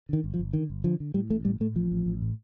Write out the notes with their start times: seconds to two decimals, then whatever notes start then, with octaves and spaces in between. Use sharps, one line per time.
0.09 D3 D#3
0.24 G1
0.34 F3
0.39 G1
0.53 D3 D#3
0.70 G1
0.84 D3 F3
1.00 D3
1.14 A2 G3
1.30 A1 A3
1.45 A2 G3
1.60 A2 A3
1.75 A1 F3
1.92 A1
2.06 A1
2.22 A2